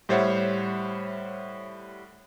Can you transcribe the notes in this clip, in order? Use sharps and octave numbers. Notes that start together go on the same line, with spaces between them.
A2 G3 C5 C#5 E5 F#5